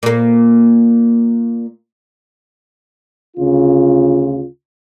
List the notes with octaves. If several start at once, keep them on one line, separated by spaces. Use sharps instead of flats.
A#2 A#3
D2 C#3 F4